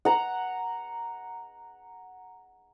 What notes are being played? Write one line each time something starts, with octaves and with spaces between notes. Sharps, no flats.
F#5 A#5